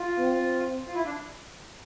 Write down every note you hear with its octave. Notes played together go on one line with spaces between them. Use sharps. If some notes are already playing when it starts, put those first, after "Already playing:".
Already playing: F4
C4
F4
E4
D4